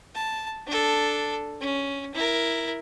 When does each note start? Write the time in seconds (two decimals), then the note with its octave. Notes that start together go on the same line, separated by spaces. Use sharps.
0.15 A5
0.67 D4 A4
1.61 C#4
2.14 E4 A#4